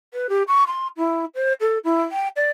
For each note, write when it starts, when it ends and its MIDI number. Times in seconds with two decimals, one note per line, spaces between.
0.13 0.27 71
0.29 0.43 67
0.47 0.64 85
0.67 0.87 84
0.97 1.25 64
1.35 1.53 72
1.60 1.78 69
1.84 2.01 64
2.12 2.28 79
2.36 2.50 74